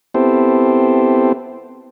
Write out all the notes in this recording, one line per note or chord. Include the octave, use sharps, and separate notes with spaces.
B3 C4 E4 G4 A4 C5